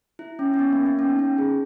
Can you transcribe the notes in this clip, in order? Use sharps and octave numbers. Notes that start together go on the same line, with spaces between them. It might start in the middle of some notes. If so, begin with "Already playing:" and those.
E4
C#4
C#4
B3
A#3
B3
C#4
D#4
C#4
G#4